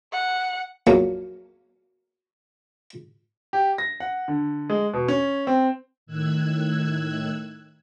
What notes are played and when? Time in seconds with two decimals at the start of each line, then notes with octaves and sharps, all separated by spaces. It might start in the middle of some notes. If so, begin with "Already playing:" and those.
0.13 F#5
0.87 A#1 A#2 F#3 A#3
3.53 G4
3.78 A#6
4.00 F#5
4.28 D3
4.70 G#3
4.94 B2
5.08 C#4
5.47 C4
6.06 A2 D#3 E6 F#6 G#6